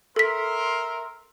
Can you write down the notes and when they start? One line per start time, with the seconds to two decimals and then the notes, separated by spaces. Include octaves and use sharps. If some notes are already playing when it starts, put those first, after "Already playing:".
0.16 A4 A#4 E5 C6 B6